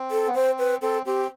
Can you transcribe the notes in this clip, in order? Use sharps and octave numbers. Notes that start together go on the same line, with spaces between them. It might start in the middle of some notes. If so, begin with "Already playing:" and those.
Already playing: C4
A4
B3
C4 C5
B4
C4 A4
C4 G4